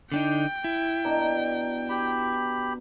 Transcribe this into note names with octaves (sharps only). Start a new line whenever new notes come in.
D3 D4 D#4 G5
E4
B2 D4 A#5
G4 B5